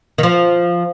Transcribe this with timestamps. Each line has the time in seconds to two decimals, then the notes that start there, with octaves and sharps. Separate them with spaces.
0.18 D#3
0.23 F3